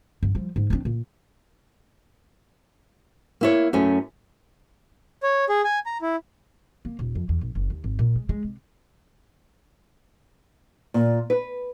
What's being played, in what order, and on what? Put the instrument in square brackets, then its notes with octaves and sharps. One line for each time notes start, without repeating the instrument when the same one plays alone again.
[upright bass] G2
F3 G3
G#2
C4 D4
A#2
[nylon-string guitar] A#3 E4 C#5
F#2 A3 C#4
[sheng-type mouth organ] C#5
G#4
G#5
A#5
E4
[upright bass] A#3
D#1
F2
E2
A#1
F#1
D#2
G#1
A#2
G#3
G#3
C3
[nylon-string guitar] A#2
B4